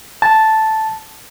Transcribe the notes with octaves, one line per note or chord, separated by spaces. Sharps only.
A5